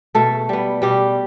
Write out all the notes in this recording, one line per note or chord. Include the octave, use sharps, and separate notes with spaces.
B2 A3 A4
G3 B3
B2 G3 G4